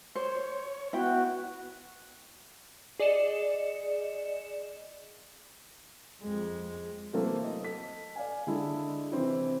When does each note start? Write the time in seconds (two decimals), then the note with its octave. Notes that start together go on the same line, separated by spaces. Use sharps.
0.16 C5 C#5
0.93 B3 E4 F#4 G5
2.99 G#4 D5 D#5 C#7 E7
6.22 F2 G#3
7.13 C3 E3 F#3 A3 A#3 C4
7.44 D#5
7.62 A4 B6
8.16 D5 F5 G#5
8.47 D3 G#3 D4 E4
9.12 C3 E3 C4 E4